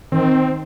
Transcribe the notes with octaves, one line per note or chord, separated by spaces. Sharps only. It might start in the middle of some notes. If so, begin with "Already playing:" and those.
D#3 C4